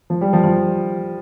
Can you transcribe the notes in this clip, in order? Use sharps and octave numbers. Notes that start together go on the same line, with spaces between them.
F3
G3
F3
F3